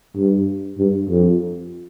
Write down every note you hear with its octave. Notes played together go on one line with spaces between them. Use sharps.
G2
G2
F2